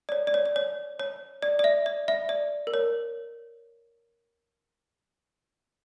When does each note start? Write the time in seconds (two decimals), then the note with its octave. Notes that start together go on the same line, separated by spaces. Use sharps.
0.09 D5
0.12 C#5
0.27 D5
0.34 C#5
0.46 D5
0.56 C#5
0.99 C#5
1.42 D5
1.59 D5
1.64 E5
1.86 D5
2.08 E5
2.29 D5
2.67 A#4
2.74 C#5